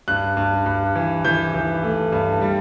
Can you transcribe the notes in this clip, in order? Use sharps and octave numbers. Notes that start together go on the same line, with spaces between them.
G2 F#6
G2
G2
E3
E3 G6
E3
A3
G2
G3